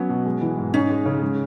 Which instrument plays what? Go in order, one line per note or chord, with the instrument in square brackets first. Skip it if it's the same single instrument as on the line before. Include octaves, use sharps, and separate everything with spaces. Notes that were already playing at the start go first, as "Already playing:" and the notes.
Already playing: [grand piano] F#3 B3 [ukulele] C#4
[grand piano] B2
G#3
E3
G#2
[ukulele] C#4 [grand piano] D#4
[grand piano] G#3
C#3
G#3